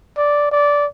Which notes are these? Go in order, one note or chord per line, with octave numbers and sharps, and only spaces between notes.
D5
D5